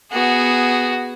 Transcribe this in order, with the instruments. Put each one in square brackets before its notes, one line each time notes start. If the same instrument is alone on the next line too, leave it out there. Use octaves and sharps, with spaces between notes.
[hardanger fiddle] B3 G#4 [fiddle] F#4